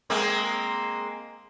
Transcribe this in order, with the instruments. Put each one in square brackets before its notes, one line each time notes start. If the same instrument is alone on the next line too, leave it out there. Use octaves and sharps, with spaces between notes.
[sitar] G#3 A#3 C4